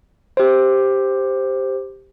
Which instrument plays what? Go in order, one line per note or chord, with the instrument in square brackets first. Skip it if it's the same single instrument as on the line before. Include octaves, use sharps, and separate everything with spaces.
[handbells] G4 C5